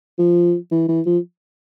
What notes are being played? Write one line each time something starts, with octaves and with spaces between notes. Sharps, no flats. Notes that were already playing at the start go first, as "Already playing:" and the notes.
F3
E3
E3
F3